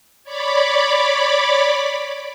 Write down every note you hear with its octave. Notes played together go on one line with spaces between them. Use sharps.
C#5 D5 B5 D6